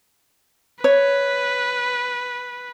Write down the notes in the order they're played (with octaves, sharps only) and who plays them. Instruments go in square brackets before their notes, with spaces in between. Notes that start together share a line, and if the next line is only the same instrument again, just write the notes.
[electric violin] B4 [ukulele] C#5